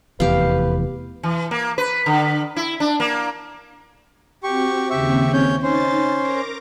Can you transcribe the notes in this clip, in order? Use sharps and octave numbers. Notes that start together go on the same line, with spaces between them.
F1 E2 G4 B4 F5
E3
A#3
B4
D3
E4
D4
A#3
C4 F#4 G4 C#6
D#2 C#3 C4 G4 E5 C#6
C#4 C#5 G6
C#4 D#4 C5 A6
A#4 A#5 D6